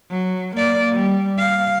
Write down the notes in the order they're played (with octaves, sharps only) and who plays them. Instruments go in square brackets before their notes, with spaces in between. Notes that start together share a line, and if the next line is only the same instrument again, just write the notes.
[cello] F#3
A#3 D5
G3
F5